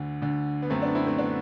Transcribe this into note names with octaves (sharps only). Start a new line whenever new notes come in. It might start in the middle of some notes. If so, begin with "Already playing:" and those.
Already playing: D2 D3
D2 D3
B3
F#2 D3 A3 C4
B3 D4
C4 E4
A3 C4
D3 B3 D4